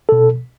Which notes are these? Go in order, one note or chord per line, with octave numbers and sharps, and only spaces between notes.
B2 A4